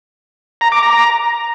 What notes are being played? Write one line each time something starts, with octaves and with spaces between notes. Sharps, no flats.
A#5
D6
A#5